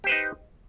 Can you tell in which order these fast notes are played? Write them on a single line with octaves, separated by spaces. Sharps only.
G4 C5 B4 D#4